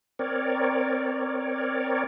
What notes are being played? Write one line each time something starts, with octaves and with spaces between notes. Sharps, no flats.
C4 A#4 C#5 D5